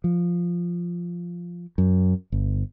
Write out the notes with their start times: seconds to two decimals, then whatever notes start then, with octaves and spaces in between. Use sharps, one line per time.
0.04 F3
1.78 F#2
2.32 G1